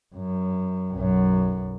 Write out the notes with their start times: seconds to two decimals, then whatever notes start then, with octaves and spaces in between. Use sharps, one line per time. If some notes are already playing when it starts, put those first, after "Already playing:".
0.15 F#2
0.93 B1 F#2